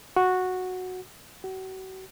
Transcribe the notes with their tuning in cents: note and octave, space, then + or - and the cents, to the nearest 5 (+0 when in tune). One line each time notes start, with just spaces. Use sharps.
F#4 -10
F#4 +35